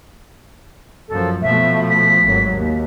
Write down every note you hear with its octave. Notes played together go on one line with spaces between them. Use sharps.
F#2 F3 A4
B2 F3 A3 E5
B6
G#1 F#3
D#2